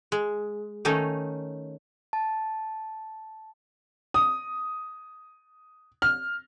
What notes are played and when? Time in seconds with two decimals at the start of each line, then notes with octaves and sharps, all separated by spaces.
0.12 G#3
0.85 D#3 A3 C#4 D#4
2.13 A5
4.14 D#6
6.02 F6